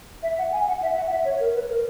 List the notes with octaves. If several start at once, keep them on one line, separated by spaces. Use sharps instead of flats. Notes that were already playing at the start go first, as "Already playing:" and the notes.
E5
F#5
G#5
F#5
E5
F#5
E5
C#5
A#4
B4
A#4